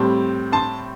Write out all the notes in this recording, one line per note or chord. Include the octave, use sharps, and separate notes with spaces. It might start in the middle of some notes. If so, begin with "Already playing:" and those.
Already playing: A2 G3 C4 A5
A5 C6